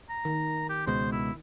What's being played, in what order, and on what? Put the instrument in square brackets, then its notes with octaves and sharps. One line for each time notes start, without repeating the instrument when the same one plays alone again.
[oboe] A#5
[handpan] D#3
[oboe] G4
[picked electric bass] C#2 B2 G#3 [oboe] C5
[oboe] E4